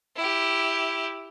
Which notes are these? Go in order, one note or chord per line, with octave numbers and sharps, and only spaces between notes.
E4 G4